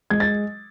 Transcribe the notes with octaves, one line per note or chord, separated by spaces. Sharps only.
G#3 G#6
A6